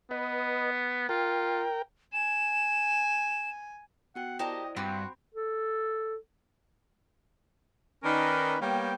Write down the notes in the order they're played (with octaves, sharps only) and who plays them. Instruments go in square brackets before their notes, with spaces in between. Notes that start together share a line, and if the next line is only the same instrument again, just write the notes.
[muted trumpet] B3 [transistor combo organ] B4 D#5
[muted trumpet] F4 [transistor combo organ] A#4 G5
[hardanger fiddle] G#5 [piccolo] E7
[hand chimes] B3 F#4 G5 [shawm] F#5
[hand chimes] E4 C5 D5 [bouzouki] G4 A#4 A5 [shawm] D#5
[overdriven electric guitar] G2 [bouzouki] C4 [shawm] F#4 [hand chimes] B5 D6
[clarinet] A4
[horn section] D#3 C#4 D#4 A#4 B4 D5
G3 A#3 B3 C#5 G5